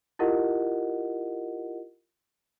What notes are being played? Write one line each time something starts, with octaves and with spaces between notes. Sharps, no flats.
E4 F4 G4 A#4 D#5 F#5